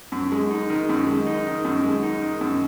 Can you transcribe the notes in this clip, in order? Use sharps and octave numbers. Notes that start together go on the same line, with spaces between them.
F#2
G#3
D#4
D#3
F#2
G#3
D#4
D#3
F#2
G#3
D#4
D#3
F#2